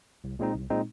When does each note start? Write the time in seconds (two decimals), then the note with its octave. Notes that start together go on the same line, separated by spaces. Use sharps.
0.24 C2
0.39 A#2 G#3 C4 D#4
0.55 C2
0.70 A#2 G#3 C4 D#4